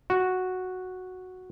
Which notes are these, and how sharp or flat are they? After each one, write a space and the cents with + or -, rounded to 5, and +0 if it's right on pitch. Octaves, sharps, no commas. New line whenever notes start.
F#4 -5